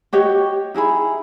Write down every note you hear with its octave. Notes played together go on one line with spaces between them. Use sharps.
F#4 G4 C#5 D#5
D#4 E4 G#4 B5